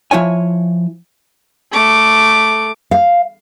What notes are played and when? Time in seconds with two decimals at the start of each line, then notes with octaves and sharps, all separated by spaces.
0.11 F3 E4 C#5 G#5
1.72 A3 D6
2.91 F5